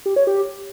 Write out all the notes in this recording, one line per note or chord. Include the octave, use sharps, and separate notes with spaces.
G4
C#5
G4